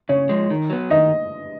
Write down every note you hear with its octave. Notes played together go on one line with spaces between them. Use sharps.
C#3 C#5
F3 G#3
D#3
F#3 B3
D#3 D#5